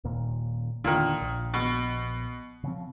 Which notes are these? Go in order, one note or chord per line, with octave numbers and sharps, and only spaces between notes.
D#1 D#2 A#2
E2 A#2 D3 D#3
A#1
B2
C#3 F3 C4